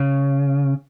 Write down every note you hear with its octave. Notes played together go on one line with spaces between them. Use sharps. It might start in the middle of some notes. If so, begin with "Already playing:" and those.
Already playing: C#3